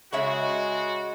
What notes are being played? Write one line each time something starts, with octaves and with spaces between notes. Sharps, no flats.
C#3 G#3 F#4 C#5 E5